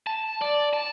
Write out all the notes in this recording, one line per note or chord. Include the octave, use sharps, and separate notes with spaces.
A5
D5
A5